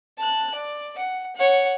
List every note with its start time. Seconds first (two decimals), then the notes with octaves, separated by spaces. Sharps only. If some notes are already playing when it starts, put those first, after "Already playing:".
0.18 A5 F#6
0.55 D5
0.98 F#5
1.36 C#5 F#5